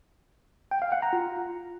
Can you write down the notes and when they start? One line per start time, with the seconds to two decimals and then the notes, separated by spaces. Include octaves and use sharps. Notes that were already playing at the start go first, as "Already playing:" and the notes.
0.71 G5
0.82 F5
0.92 F#5
1.02 A#5
1.13 F4